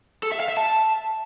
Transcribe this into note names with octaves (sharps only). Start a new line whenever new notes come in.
A4
E5
F5
E5
A5